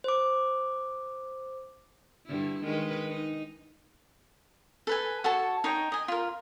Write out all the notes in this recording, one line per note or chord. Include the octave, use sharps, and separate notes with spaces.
C5 D6
G2 D3 E4
D#3 G#3 B4
D#4
A4 B4 G#5
F#4 A4 C#5 A5
D#4 C#5 G5
D#5 G#5
F4 A#4